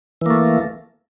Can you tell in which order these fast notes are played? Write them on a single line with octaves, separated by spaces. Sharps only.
E3 A#3 A3